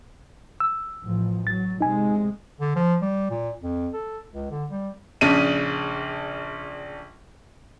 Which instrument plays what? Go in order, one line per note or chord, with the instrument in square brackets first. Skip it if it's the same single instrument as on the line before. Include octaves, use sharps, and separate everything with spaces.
[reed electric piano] E6
[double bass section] A1 F3
[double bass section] F#3 [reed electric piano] A6
[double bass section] C3 G#3 [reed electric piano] D#4 G#5
[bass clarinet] D3
F3
G3
A#2
F2
A4
C#2
D3
G3
[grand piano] A#1 C#3 D4 D#7